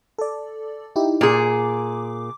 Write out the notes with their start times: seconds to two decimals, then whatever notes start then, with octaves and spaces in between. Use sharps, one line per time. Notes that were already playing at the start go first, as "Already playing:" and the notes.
0.18 A4 D5
0.96 D#4 E4 G4
1.21 A#2 G#4 D6